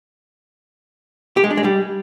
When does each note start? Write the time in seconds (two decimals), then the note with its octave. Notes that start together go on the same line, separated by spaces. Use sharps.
1.37 G4
1.44 G#3
1.51 D4
1.57 G#3
1.64 G3